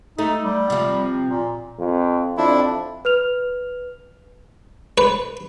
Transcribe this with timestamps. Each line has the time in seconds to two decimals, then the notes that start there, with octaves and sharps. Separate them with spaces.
0.19 A3 D#4
0.43 G3
0.70 C3 F3
1.26 A#2
1.79 F2
2.38 F2 D4 E4
3.05 B4 F6 F7
4.98 B4